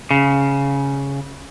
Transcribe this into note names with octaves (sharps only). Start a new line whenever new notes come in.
C#3